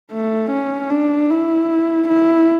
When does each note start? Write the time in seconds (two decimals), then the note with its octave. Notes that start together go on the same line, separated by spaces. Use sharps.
0.12 A3
0.51 C#4
0.90 D4
1.30 E4
2.08 E4